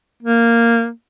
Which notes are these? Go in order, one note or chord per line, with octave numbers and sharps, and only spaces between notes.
A#3